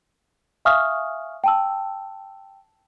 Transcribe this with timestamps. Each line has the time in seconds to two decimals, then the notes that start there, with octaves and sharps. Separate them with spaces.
0.65 E5 F5 G#5 C#6 D#6 F6
1.44 G5 A5 E6